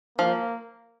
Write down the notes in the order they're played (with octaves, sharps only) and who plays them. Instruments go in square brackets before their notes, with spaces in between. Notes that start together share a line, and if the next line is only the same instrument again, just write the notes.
[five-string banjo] F3 [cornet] A#3